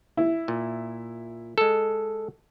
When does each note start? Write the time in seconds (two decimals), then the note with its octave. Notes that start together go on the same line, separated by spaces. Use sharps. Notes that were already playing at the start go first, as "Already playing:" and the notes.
0.17 E4
0.48 A#2
1.58 G#3 A4